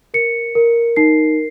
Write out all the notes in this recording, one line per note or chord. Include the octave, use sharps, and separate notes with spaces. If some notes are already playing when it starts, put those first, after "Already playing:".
A#4 C#7
A#4
D#4 C7